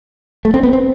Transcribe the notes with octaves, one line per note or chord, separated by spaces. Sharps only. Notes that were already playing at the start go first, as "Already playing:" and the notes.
A3
C4
B3
C4